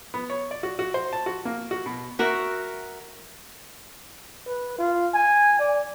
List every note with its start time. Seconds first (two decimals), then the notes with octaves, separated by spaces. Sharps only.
0.14 B3
0.30 C#5
0.51 D5
0.63 F#4
0.79 F#4
0.94 C5
1.13 A5
1.26 F#4
1.45 A#3
1.71 F#4
1.86 B2
2.19 F#4 A#4 E5 F#5
4.47 B4
4.79 F4
5.14 G#5
5.60 D5